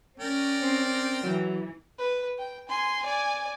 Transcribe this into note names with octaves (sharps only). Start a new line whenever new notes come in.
C#4 A#4 D5 G5
C4
E3 F#3
B4
G5
G#5 C6
D5 G#5